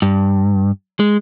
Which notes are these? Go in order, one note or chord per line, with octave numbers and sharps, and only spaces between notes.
G2
G#3